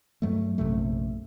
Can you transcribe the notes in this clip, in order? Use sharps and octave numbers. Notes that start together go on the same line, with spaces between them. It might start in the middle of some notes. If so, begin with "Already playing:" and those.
G2 F#3 A3
A#1 F#2 C3 A3